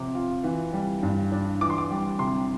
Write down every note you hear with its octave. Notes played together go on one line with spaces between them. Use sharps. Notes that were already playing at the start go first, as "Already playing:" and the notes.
Already playing: C3 F3 C4 D6
F4
E3
G3
G2
D4
E3 D6
C6
D6
G3
C3 C6